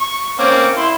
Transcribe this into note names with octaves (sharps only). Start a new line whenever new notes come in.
C#6
A#3 C4 C#4
E4 C6